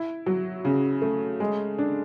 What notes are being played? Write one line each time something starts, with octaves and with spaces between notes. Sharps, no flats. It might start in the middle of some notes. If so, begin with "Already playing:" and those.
Already playing: E4
F#3
C#3
A3
G#3
D4